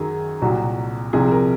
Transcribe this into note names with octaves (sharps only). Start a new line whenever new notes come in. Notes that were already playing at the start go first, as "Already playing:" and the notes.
Already playing: F#2 D#3 F#3 G#4
C2 A#2 F#3 F#4
C2 C3 F3 G#4
A#4